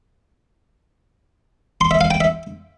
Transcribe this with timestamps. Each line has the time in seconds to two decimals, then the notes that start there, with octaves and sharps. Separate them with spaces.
1.81 C6
1.91 E5
2.01 F5
2.11 G5
2.21 E5